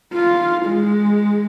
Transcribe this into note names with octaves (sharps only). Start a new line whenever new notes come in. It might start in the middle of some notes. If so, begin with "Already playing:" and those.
F4
G#3